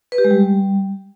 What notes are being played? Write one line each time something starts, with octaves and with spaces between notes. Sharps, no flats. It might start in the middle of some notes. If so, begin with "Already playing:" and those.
B4
G4
G#3
G3